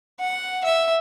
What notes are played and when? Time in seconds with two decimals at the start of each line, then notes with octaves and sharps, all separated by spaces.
0.20 F#5
0.64 E5